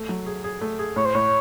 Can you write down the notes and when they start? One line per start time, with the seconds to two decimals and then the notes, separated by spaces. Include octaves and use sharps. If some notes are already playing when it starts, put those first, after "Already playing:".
Already playing: A3
0.09 F#3
0.26 G#4
0.44 G#4
0.61 A3
0.79 G#4
0.96 A2 C#5
1.05 C5
1.14 A2 C#5